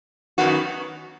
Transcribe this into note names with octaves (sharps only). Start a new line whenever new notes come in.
F#2 D#3 F#3 B3 F#4